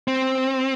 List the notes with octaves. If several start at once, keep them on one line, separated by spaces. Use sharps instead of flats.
C4